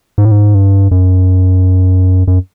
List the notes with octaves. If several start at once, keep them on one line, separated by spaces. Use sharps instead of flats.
G#2
A2
G#2
G2
F#2
F#2